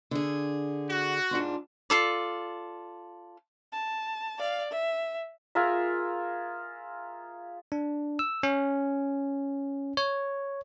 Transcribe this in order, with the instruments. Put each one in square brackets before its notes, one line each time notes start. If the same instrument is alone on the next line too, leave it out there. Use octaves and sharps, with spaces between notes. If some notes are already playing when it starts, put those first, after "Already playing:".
[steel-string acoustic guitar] D3 G#4
[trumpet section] F#4
[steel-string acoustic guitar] G#2 D4 F4
[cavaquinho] F4 A4 D5
[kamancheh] A5
D5 F5
E5
[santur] F4 G#4 A#4 E5
[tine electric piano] D4
E6
C#4
C#5